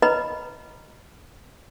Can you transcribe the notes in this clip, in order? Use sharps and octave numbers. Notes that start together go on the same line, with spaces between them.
B4 C#5 D#5 A#5 B5